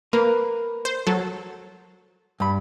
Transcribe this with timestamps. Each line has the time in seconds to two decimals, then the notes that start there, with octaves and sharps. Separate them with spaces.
0.13 A#3 A#4 B4
0.85 C5
1.07 F#3 A4
2.40 G2 B5